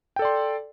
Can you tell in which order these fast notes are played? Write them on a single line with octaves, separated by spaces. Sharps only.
G5 A4 D5 C6